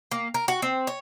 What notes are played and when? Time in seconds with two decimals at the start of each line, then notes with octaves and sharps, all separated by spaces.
0.12 A#3
0.34 A#4
0.48 F#4
0.62 C4
0.87 C#5